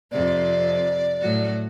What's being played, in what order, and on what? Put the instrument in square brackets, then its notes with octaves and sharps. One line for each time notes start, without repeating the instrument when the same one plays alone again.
[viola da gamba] F2 C3 [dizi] D5
[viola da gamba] A2 F#3 F#4